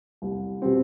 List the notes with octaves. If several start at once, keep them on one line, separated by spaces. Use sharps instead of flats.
C2
B2 G3 C4